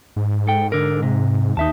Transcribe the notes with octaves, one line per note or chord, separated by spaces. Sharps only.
G#2
A4 G5
D3 A#4
C3
D#2 D#4 E5 A5